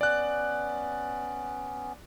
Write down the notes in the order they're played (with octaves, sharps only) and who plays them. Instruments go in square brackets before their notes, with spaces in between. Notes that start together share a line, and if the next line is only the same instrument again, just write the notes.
[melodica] B3 C#4 [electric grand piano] D5 F#6